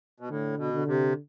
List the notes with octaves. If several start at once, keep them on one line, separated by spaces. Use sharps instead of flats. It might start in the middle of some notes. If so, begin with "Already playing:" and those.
B2
A2 D3
B2
D3
C3